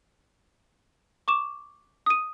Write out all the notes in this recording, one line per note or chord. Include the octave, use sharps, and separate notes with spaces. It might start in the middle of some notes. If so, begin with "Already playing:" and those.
C#6 D6 E7
D#6 D#7